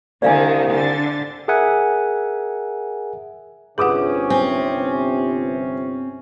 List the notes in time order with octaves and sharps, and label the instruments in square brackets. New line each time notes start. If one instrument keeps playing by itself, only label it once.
[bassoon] C2 [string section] D3 D#3 [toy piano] D5 F5 G#5
[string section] D3 A6
[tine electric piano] G#4 A#4 E5 F#5 G#5
[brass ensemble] G1 C3 C#4 [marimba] G#4 F#5 [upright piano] B4 D6 D#6
[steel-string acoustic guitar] C4 [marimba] G#5